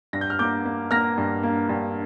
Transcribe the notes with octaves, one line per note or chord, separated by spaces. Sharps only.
G2 A#6
G6
F6
A#3 D6 G6
A#3
A#3 F6 A#6
G2
A#3
G2